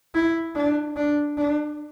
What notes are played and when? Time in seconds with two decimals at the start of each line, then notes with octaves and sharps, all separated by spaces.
0.15 E4
0.55 D4
0.96 D4
1.37 D4